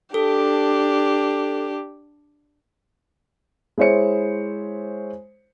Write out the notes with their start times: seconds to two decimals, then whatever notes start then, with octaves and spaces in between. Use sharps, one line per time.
0.14 D4 G4 A4
3.78 G#3 E4 C5 C#5 C#7